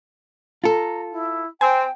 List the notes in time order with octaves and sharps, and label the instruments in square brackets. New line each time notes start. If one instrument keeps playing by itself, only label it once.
[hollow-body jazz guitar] F4 A4 [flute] A#5
[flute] E4
[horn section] C4 [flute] G5 [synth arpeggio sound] G#5